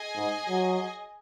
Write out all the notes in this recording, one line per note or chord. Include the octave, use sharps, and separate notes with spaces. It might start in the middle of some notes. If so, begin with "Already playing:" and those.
Already playing: G#4 D#5 G#5
G#2
F#3